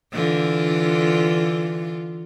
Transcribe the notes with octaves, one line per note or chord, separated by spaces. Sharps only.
D3 E3 F4